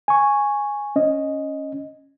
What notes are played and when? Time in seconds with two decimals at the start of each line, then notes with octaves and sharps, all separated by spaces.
0.08 G#5 C#6
0.96 C#4 D#5